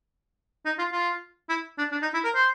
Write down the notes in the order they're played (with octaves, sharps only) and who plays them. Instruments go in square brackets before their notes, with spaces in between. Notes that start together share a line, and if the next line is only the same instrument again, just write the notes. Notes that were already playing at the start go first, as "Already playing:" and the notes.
[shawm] D#4
F4
F4
E4
D4
D4
D#4
E4
A#4
C5